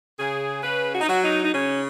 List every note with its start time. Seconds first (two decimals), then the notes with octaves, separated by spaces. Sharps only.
0.19 C#3 G#4
0.63 C#3 B4
0.93 F#4
1.01 D#4
1.09 F#3 F#4
1.23 D#4
1.43 D#4
1.53 C#3 C#4